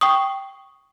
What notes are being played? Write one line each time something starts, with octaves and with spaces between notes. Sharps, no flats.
G5 C#6 D#6